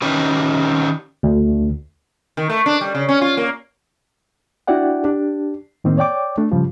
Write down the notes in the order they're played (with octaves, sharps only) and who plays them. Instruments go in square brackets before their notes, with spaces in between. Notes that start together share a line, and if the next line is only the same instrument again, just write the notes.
[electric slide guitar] D#3 C#4 G4 B4
[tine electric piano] D2
[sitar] D#3
A3
D4
G3
C#3
C#4
F4
A#3
[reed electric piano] D4 E4 F#4 D5 F#5 G5
D4 G4
A2 D#3 A#3 C4
C#5 D5 G5 D6
A3 D4
G2 C#3 F3 G3